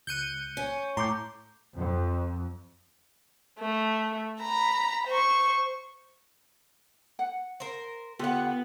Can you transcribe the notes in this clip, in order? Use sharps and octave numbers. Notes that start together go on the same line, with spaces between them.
C#2 F#6 G6 C#7 D#7
C#4
A2 A#5 C6 D6 G6
F2
A3
A#5 B5
C5 C#6
F#5
A#4 C5
D3 B3 F4 G4 B4 F#5